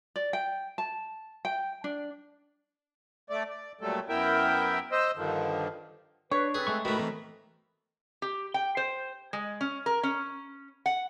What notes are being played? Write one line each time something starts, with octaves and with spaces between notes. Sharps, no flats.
D5
G5
A5
G5
D4
A3 D5
D5
A#2 F#3 G3 A3 A4
F#2 B3 E4 A#4 E5 G5
C5 D#5 E6
G2 D3 D#3 F3
D4 B4 C#5
C4 G#4 A4 B4
G#3 A3 C#6
A2 D#3 A3 F#4 B4 B5
E3 A#3 C4
G4
G5
C5
G#3
C#4
A#4
C#4
F#5